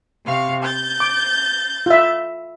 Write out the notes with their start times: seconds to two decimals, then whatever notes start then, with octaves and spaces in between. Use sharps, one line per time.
0.25 C3 F5 C#6
0.62 G6 A6
1.00 D6
1.86 F4 E5